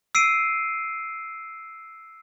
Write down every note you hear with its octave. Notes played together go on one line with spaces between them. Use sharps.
E6 C7 D7 D#7